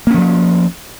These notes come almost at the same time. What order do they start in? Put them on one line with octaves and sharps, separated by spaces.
A#3 C#4 D#3 F3